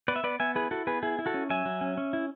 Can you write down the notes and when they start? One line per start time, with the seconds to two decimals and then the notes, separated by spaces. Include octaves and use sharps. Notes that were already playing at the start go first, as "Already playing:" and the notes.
0.08 B3 B4 D5
0.16 E5
0.24 B3 B4 D5
0.40 B3 E5 G#5
0.55 E4 G#4 B4
0.71 E4 F#4 A4
0.87 B3 G#4 B4
1.03 E4 G#4
1.19 E4
1.26 F#4 A4
1.34 C#4
1.50 F#3 E5 G#5
1.65 F#3
1.81 C#4
1.97 C#4
2.13 E4